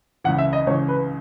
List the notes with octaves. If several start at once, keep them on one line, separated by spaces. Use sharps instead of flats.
C#2 C#3 E3 F#5
E5
D#5
C#2 C#3 E3 C#5
B4